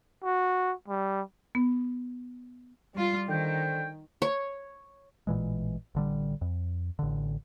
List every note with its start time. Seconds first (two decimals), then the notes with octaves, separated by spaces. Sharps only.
0.23 F#4
0.88 G3
1.55 B3
2.94 G3 F4
3.29 D3 D#3 C5 G5
4.22 C#5
5.27 A1 A#2 E3 G#3
5.95 A1 D3 G3
6.41 F2
6.99 A1 D3